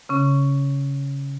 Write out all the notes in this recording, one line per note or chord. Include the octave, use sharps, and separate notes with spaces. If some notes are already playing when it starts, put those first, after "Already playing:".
C#3 C#4